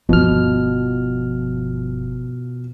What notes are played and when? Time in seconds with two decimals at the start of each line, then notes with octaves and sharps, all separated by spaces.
0.09 G1 B2 F3 F4 F6